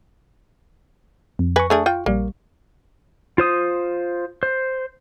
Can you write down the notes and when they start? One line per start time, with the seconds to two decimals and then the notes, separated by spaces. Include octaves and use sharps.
1.39 F2
1.56 B4 G#5 C#6 A#6
1.70 A3 D4 G#4
1.86 F4 G5
2.06 A#1 G3 A#3
3.38 F4 C5 D#6
4.43 C5